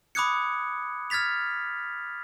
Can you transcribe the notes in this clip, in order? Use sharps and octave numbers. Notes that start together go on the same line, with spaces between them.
B5 D6 D#6 F#6 G#6 C#7
F6 G#6 A6 B6 F7